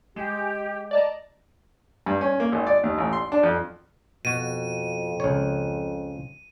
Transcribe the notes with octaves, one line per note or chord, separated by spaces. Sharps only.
G#3 G4
D5 D#5 A5 A#5
G2
C#4
A#3
G#1
D5
D#2
A1
C6
D4
F2
F2 B2 F#4 D#7
C#2 C#5